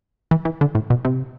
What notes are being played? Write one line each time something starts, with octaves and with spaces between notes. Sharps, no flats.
E3
E3
D3
A2
B2
C3